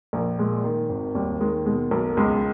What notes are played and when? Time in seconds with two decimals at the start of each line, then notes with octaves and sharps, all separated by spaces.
0.13 A#1 A#3
0.38 A#2 G#3
0.64 D#3
0.89 G#1
1.15 D#2 G3
1.41 D#3 G#3
1.66 B2 G#3
1.91 B1 A#3
2.07 A#3
2.17 C#2 G#3